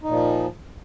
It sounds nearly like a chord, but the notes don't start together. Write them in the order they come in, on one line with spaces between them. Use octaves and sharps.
D#4 A#2 F3